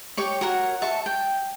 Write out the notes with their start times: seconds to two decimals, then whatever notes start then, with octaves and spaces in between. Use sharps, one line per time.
0.17 G4 C#5 C#6
0.41 F#4 A#4 C#5 F#5
0.82 E5 A5 C#6
1.06 G5